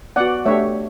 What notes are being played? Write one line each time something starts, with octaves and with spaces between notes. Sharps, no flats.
B3 F#4 D5 F#5
A3 D4 G4 C#5 E5